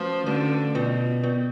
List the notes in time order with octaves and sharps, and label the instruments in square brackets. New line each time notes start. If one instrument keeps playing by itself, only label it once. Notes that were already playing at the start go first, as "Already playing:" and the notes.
Already playing: [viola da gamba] F3 [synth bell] A3 C#4 F#4 B4
[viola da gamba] D3 [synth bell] A3 C#4 F#4 B4
[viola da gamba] B2 [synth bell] B3 F4 B4 D5
[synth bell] B3 F4 B4 D5